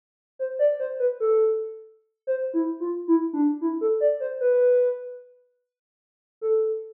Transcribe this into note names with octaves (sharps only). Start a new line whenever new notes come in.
C5
D5
C5
B4
A4
C5
E4
F4
E4
D4
E4
A4
D5
C5
B4
A4